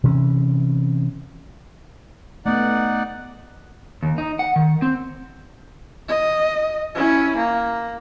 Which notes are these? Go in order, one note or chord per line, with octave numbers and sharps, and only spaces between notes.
C3 E3 C#4
A3 B3 D#4 D5 F#5
D#2
D#4
F#5
D#3
C4
D#5
C#4 E4
A#3